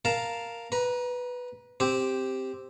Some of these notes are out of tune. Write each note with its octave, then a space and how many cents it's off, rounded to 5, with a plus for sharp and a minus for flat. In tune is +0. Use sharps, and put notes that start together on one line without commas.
A#4 +0 F5 +0 A5 +0
B4 +0 A#5 +30
C4 +0 G4 +0